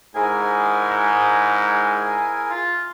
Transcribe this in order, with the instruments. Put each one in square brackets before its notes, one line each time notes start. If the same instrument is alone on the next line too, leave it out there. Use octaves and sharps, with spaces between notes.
[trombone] G#2 [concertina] E4 G#4 A#4 [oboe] G#5
[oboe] F4